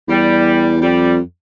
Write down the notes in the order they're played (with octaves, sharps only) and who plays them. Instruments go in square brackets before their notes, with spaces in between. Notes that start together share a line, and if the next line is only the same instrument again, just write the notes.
[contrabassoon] E2 [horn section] G3
[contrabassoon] F2 [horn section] G3